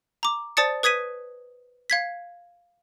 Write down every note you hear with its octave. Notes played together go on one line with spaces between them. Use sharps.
A#5 D6
C5 D5 A5 D#6 A6 C#7
B4 D#6 G#6 B6 D#7
F5 G#6 B6